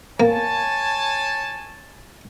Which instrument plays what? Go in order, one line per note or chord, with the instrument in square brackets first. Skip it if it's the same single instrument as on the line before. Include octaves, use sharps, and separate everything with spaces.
[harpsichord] A#3 [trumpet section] C#5 G#5 A5